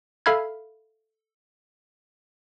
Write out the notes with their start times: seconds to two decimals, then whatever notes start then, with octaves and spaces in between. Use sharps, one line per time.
0.26 A4 E5 F5 B5 F6 G#6